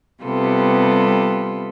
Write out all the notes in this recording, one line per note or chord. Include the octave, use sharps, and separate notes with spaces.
C3 G3 B3 F4 A4